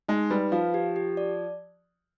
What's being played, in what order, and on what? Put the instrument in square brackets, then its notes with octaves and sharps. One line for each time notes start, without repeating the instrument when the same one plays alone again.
[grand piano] G#3 [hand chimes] D#4
[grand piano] G3 [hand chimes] B4
[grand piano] F3 [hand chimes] F5
[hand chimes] G4
G4
D5